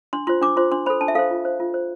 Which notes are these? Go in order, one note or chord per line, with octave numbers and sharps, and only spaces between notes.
D4 C6
F4 C5 C6
D4 D6
F4 C5 C6
D4 C6
A4 C5 B5
D4 A5
E5
A4 C5 F5
F4
C5
F4
C5